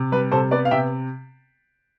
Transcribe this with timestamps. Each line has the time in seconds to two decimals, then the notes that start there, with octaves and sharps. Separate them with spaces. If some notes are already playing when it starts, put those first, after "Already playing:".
Already playing: C3
0.12 G3 B4
0.32 C3 A4 C5
0.51 B3 B4 D5
0.65 F5
0.71 C3 E5 G5